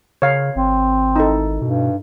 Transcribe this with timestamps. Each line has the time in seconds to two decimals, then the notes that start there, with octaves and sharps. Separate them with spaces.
0.22 C#3 C#5 F5
0.56 G#1 C4
1.16 D#4 E4 A4
1.62 G2 B2